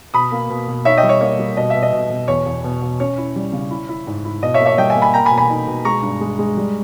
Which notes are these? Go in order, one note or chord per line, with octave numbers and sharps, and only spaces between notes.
B2 B5 D#6
A#3
B2
B2
D#4 C#5 E5
D#5 G5
G3
C#5
A#3 C#5
G3
B2 D#5
B2 E5
D#5
B2
B2
E2 C#5
E2
B2
B2
C#4 C#5
E4
G3
C#3
E4
E4
G#2
E4
B2 D#5
C#5 E5
A#3
C#5 E5
G3 D#5 G5
E5 G#5
A#3
G#5 B5
A#3 G5 A#5
G#5 B5
B2
G#5 B5
D#4
B2
G#3 A#5 C#6
G2
G#3
G#3
G3